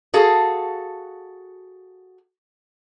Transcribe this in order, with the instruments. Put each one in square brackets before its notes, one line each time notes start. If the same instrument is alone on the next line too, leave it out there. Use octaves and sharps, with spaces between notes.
[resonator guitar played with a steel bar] F#4 G#4 A4 F5